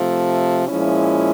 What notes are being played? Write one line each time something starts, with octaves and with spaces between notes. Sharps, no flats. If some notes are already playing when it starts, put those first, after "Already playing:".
Already playing: C3 F3 A3
A#2 F3 G#3 C#4 E4